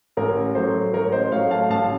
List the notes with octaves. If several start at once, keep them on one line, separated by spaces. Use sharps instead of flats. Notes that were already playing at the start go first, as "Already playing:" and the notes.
A1 A#4
A2 F#3 A3 C5
A1 A#4 C#5
C5 D#5
A2 F#3 A3 C#5 F5
F5 A5
A1 F5 A5